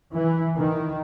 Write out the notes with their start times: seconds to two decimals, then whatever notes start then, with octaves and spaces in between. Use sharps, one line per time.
0.12 E3
0.57 D#3